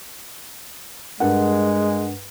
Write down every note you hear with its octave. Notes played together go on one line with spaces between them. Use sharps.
G2 G#3 A#4 F#5